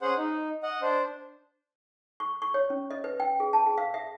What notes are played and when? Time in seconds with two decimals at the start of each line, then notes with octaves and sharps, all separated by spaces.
0.01 C#4 G#4 C5 F#5
0.17 D#4
0.63 D#5 F#5
0.82 D4 C5
2.20 C#6
2.42 C#6
2.54 C#5
2.70 C#4
2.91 D#5
3.04 B4
3.20 G5
3.40 G#4
3.53 A5
3.66 G#4
3.78 F5
3.94 E5